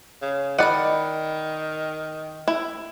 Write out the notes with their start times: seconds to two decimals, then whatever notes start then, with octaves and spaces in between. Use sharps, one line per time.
0.22 C#3
0.59 D#3 D5 D#5 F#5 B5
2.48 E4